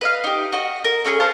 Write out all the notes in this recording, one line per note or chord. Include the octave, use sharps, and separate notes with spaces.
B4 D#5 F5
D#4 G4
F#4 D#5
A#4
A3 C#4 F#4 G#4
C5 F5 A5 C#6